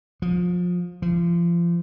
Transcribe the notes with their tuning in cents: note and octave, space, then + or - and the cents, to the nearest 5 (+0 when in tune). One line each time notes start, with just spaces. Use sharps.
F3 +25
F3 -30